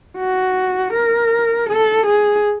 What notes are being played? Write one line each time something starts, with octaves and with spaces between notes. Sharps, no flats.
F#4
A#4
A4
G#4